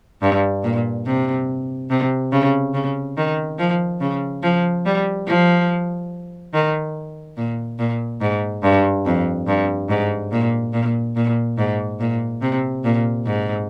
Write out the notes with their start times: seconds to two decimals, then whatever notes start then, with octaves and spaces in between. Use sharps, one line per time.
0.22 G2
0.64 A#2
1.06 C3
1.90 C3
2.32 C#3
2.74 C#3
3.17 D#3
3.59 F3
4.01 C#3
4.43 F3
4.85 G3
5.28 F3
6.54 D#3
7.37 A#2
7.79 A#2
8.21 G#2
8.63 G2
9.06 F2
9.47 G2
9.89 G#2
10.32 A#2
10.73 A#2
11.16 A#2
11.58 G#2
12.00 A#2
12.42 C3
12.84 A#2
13.26 G#2